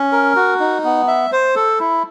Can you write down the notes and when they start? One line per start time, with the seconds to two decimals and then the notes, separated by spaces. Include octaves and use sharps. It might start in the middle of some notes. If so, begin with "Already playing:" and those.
Already playing: C#4
0.12 A#4
0.36 F#4
0.60 D#4
0.84 B3
1.08 E5
1.32 C5
1.56 A4
1.80 E4